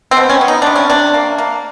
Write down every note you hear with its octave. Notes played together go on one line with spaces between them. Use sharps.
C4
B2
C#4
B3
D#4
C3 D4
C#4
C3 D4
A#3
A#3